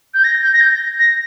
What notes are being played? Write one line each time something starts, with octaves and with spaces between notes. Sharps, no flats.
G6
A#6
G6
A#6
G6
A#6